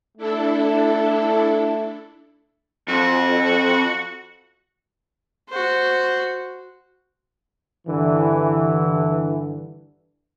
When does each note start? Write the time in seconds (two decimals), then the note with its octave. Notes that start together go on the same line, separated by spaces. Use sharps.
0.17 A3 D4 E4 A4
2.88 F2 F#4
5.49 F#4 C5
7.87 G2 D3 E3